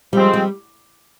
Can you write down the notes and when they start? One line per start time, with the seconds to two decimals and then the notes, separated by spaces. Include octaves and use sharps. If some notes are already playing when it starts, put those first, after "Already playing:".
0.13 F3 G3 G#3 C4
0.33 G3